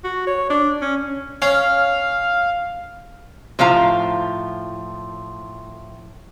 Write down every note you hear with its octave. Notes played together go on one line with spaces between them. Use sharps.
F#4
C#5
D4
C#4
C#4 F5
A2 F3 F5 A#5